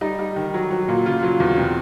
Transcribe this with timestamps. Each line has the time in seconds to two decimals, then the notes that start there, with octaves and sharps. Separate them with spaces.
0.01 G3 D#4
0.19 G3
0.36 D#3
0.54 F#3
0.70 F#3
0.88 A#2
1.05 C#3 F4
1.23 F#3
1.40 E2
1.58 C3